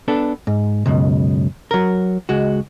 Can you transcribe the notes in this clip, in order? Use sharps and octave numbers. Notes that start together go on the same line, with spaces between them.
B3 D4 A4
G#2
C#2 F#2 B2
F#3 A#4
C#2 G#3 F#4